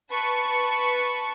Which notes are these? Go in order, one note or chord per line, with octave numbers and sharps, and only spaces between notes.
B4 A5 C#6